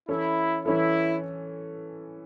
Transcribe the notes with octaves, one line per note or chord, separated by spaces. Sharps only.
E3 C#4 E4 A4
E3 C#4 E4 A4